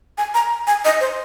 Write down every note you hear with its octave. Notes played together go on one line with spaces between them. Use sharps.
G#5
A#5
G#5
D#5
C5